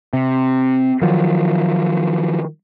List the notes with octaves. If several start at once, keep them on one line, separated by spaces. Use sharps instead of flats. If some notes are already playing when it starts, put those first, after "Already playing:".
C3
D#3 F3 F#3